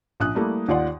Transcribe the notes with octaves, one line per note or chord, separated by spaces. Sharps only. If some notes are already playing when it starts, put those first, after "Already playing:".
A#1 D#6 F#6
G3 A3 A#3 E4
D#2 F4 D5 F#5